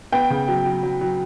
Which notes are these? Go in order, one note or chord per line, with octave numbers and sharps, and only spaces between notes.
B3 G5
C#3
F#3
F#3
F#3
F#3